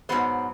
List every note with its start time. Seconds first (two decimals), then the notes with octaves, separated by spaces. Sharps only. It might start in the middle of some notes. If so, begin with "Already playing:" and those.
0.09 G#2 D#3 F#3 B3 C5